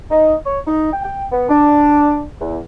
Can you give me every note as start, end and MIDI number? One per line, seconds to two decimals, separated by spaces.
0.10 0.35 63
0.46 0.59 73
0.67 0.91 63
0.93 1.02 79
1.04 1.25 79
1.32 1.48 59
1.49 2.23 62
2.41 2.58 40